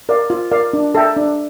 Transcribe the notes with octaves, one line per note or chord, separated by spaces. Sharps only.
A#4 D5 F5
F4
A#4 D5 F5
D4
A4 E5 G5 A#5
D4